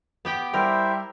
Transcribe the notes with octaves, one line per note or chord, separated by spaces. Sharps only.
B3 G4 G5
G3 E4 A#4 C5 E5